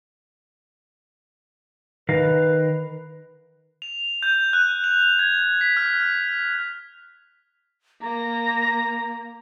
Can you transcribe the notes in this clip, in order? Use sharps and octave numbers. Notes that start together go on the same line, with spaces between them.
D#3 A#4 B4 F5
F7
G6
F#6
F7
G#6
B6
F6
A#3 A#5